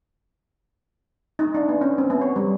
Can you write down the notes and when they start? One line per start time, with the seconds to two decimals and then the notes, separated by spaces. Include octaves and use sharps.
1.39 D#4
1.55 D4
1.69 B3
1.81 C#4
1.98 C4
2.10 B3
2.21 C#5
2.36 G3